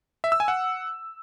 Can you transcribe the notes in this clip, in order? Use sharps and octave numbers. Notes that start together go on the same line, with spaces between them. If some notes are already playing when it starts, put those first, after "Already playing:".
E5
E6
G#5
F#5